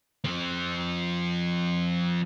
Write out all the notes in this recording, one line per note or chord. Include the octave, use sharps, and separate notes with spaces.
F3 C4